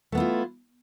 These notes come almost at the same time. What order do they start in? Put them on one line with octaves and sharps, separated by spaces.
A3 B3 E4 F4